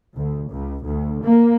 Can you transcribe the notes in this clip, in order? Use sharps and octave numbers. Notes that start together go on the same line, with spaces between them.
D2
C#2
D2
A#3